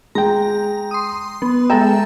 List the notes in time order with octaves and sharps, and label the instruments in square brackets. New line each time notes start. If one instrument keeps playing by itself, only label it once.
[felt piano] G#3 G5 [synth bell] A#5
[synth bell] C6 D#6
B3
[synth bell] G#3 A4 E5 [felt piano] G5 A#5